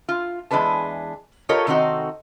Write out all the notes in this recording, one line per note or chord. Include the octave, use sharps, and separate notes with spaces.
F4
E2 G#3 D4 B4 A5
F4 G4 A4 A#4 C#5 D#5
C3 D#3 C4 D#4 F#4 A4